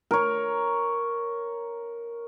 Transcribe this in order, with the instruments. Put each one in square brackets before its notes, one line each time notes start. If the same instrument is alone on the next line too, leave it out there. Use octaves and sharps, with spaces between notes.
[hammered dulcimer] A#4 C#5